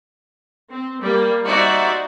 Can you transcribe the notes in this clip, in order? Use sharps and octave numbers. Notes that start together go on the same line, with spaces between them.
C4
G3 A#3
D#4 F#4 C5 D5 E5